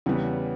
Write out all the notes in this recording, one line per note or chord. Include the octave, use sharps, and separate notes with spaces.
E2 C#3 E3 G3 B3